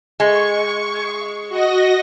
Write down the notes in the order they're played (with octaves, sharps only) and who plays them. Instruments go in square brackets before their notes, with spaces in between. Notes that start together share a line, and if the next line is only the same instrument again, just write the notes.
[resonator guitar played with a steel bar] G#3 [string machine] C#6
[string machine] F#4 D#5 A#6